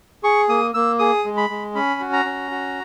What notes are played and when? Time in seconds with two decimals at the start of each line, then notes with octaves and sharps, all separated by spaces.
0.24 G#4 C#6
0.49 A#3 D#6
0.74 A#3 E6
0.99 G#4 D#6
1.25 G#3
1.37 B5
1.50 G#3
1.75 C#4 B5
2.00 F#4
2.13 A#5
2.25 C#4
2.51 F#4